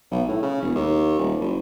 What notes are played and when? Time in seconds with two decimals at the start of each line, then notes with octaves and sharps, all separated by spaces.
0.11 B1
0.29 A2
0.43 C#3
0.62 E1
0.75 D#2
1.19 D#1
1.40 F#1